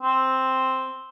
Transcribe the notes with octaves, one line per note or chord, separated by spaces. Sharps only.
C4